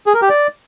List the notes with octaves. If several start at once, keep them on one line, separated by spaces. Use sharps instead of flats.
G#4
A#4
G4
D5